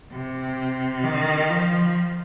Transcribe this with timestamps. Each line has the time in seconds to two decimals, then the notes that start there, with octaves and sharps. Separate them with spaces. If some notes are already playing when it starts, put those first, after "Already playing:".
0.12 C3
1.03 D#3
1.50 F3